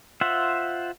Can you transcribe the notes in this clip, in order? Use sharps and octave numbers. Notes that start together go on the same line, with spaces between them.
F4 C5 E5 F#5